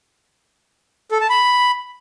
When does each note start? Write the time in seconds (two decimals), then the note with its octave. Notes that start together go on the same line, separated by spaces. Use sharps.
1.11 A4
1.21 A5
1.30 B5